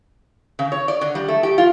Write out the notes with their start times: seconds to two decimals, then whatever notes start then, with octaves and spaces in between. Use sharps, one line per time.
0.59 C#3
0.72 C#5
0.88 D5
1.01 D3
1.15 G3
1.28 A3
1.43 G4
1.58 F4